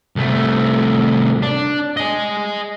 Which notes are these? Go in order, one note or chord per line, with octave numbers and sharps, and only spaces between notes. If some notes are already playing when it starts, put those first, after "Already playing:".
C2 A3
D4
D#5 G#5